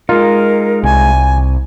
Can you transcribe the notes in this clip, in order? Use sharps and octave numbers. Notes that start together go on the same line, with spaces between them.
G#3 D#4 F4 A#4
C2 G#5